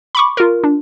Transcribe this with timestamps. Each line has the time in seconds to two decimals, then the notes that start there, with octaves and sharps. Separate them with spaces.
0.15 B5 C#6 D6
0.37 F4 A#4
0.64 D4